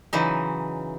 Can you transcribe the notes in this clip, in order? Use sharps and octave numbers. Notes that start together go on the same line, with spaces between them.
C#3 E3 F#3 D#4